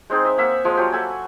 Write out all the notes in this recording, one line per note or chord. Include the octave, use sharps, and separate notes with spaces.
G#3 C4 D#4 G#4
D#5 E5
A#3 E5 F#5
F3 G#3
F#3 F4 G4
A4 E5 F#5 G#5